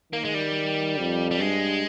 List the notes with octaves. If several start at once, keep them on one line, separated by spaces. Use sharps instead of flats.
D#3 A#3
G#3
G3
F2
G3
G2 G#3